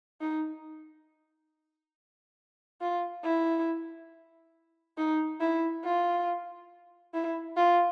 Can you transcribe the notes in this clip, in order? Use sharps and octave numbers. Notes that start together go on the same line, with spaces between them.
D#4
F4
E4
D#4
E4
F4
E4
F4